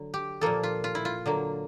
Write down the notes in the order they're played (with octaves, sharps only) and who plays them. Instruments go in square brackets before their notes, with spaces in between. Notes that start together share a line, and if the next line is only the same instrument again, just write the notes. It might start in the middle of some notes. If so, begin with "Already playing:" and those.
Already playing: [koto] D3 F#3
G4
A#2 F3 A#3 A4
F4
F4
E4
F4
D3 F#3 A#3